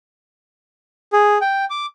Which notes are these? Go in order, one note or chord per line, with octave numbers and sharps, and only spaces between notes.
G#4
G5
D6